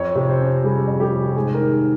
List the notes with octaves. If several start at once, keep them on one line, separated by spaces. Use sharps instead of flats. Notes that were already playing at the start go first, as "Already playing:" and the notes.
Already playing: F2 C#5
C3
C5
C#4
G3 G#4
F2
G4
C3
G#2 G#4
A#4
D#3
G#4